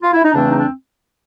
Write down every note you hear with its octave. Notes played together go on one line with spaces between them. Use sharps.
F4
E4
D#4
E2 C#3 E3 A3 C4 D4
D#4
D4